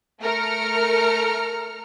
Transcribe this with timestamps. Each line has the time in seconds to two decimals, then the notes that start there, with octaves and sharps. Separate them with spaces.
0.22 A3 A#4 A#5 F6 C#7